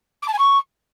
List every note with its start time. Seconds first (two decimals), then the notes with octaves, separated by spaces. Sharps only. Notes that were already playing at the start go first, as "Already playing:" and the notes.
0.22 D6
0.28 A5
0.33 G#5
0.39 C#6